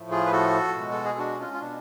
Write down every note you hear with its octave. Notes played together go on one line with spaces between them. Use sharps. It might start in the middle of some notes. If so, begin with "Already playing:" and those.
Already playing: A2 F3 A3
F4 G#4
B4
F#4 A4
B2 G#3
A4
G#4
D4 F#4
C#4 F4
F4
B2 D4